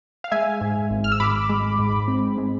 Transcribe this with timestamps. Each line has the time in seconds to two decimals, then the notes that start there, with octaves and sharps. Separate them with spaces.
0.24 F5
0.31 G#3 E5 G#5
0.61 G#2
0.90 G#1
1.04 F6
1.12 E6
1.20 G#1 B5 D6
1.49 G#3
1.79 G#2
2.08 C4
2.38 G#3